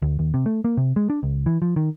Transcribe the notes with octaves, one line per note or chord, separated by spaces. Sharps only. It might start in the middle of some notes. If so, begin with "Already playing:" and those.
D2
D#2
C3
A3
A#3
C3
G#3
D4
C#2
E3
F3
D#3